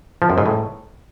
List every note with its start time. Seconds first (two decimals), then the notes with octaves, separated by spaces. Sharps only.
0.22 F3
0.30 F#2
0.38 G#2
0.46 A2